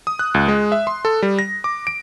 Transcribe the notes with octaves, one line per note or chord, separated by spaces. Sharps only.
D#6
F#6
C#2
G#3
E5
C6
A4
G3
A#6
D6
D7